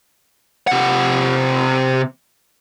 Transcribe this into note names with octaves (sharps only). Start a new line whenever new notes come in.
C3 F#5